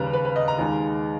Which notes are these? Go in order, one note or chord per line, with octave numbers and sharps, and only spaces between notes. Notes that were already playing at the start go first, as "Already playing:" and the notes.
Already playing: D#2 C#3 G3 B4 A#5
B4
B4
D#5
A#5
D#2 D#3 G#3